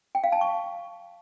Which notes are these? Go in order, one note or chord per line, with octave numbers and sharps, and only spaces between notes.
G5
F5
A5
C#6